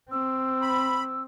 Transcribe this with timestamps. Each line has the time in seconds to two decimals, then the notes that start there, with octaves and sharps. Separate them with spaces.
0.11 C4 E6
0.62 B5